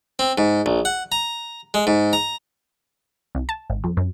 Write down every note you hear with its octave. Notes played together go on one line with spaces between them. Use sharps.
C4
G#2
A#1
F#5
A#5
G#3
G#2
A#5
C2
A5
G#1
F2
F#2